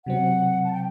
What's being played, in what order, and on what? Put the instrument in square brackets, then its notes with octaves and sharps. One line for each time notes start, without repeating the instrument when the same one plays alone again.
[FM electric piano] C3 F#3 C4 [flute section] F#5
[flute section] A5
G5